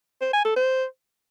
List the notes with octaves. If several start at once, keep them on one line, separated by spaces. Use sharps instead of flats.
C5
G#5
A4
C5